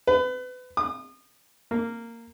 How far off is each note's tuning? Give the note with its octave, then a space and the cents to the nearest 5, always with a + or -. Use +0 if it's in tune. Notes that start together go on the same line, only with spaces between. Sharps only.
B4 +30
D#6 -35
A#3 -15